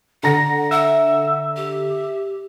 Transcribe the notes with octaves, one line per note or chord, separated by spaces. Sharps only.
D3 F#5 A#5 A#6
E5 F#5
G4